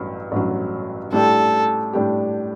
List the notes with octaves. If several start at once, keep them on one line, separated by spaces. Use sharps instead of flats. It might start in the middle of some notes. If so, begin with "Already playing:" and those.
Already playing: A1 G2 F#3
A1 G2 F#3
A2 G3 D4 G4 A4
A2 G3 D4 G4